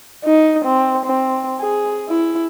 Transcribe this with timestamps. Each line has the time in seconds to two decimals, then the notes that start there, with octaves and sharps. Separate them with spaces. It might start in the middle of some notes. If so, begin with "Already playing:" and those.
0.24 D#4
0.64 C4
1.05 C4
1.59 G#4
2.09 E4